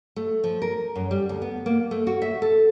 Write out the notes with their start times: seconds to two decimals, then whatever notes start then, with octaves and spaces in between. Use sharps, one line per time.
0.16 A3
0.44 F3
0.62 A#4
0.96 F#2
1.11 G3
1.29 D2
1.42 B3
1.66 A#3
1.91 A3
2.07 F#4
2.22 E5
2.42 A4